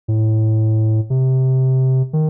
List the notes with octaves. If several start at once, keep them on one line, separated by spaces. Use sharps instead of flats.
A2
C3
D#3